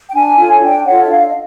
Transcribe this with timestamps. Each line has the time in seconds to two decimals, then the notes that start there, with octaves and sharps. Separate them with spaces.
0.08 G5
0.14 D4 G#5
0.37 F4 A4 C#5
0.61 D4 G5
0.85 F4 A4 C#5 F#5
1.05 E5
1.09 D4 F5
1.27 D#5